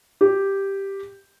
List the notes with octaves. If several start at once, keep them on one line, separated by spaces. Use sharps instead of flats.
G4